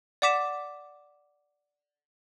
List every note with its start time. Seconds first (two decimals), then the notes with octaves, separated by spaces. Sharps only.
0.22 D5 F#5 D6 B6 E7